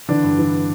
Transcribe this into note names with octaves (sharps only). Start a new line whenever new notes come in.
D3 E3 D4
G2
E3